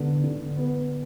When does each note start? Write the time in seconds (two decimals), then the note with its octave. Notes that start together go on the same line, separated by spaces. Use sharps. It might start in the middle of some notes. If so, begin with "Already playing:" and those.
Already playing: D3 B3
0.24 D3
0.57 B3